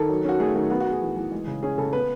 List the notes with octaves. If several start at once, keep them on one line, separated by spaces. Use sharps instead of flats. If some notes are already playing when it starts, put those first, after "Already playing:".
Already playing: D#3 A4
F#3
C#4 F#4
A3 G#4
D#3 F#4
B3 F#4
F#4
B3 G#4
E3
E3
G#3
C#3
C#4 G#4
C#3 A4
B3 B4